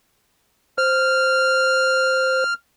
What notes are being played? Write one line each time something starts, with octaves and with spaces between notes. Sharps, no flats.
C5 F6